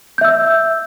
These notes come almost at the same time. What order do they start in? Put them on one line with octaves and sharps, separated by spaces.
G6 E5 E6